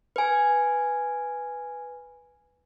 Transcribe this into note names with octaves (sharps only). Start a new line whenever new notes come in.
B4 G#5